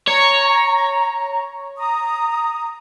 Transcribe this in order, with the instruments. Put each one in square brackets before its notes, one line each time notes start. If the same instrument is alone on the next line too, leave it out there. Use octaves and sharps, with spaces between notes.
[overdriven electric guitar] C#5 [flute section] A#5
[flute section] A#5 D#6